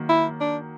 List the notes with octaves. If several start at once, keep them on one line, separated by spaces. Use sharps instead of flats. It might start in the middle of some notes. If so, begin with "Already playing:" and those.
Already playing: D#3 F#3 A#3
E4
D4